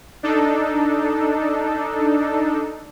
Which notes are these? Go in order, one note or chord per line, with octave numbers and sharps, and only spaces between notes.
D4 D#4 A4